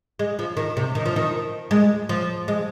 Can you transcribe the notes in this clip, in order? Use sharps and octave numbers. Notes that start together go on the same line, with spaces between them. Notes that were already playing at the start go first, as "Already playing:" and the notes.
G#3
F3
D#3
C3
D#3
F3
D#3
G#3
F3
G#3